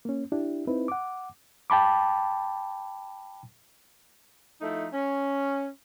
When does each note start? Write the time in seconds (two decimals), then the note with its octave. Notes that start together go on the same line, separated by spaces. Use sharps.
0.05 A#3 C#4
0.32 D4 E4 G4
0.67 C4 D#4 E4 B4
0.88 F#5 D6
1.70 G5 A5 B5 D6
4.61 F3 A3 D#4 E4
4.93 C#4